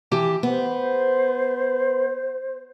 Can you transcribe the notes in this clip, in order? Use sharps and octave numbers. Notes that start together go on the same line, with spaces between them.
E3 G4 A5
B3 C5